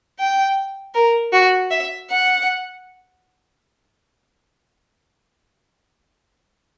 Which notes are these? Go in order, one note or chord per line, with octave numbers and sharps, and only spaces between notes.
G5
A#4
F#4
E5
F#5